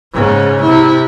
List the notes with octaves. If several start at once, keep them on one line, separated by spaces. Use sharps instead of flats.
G#2 C#3
C3 E4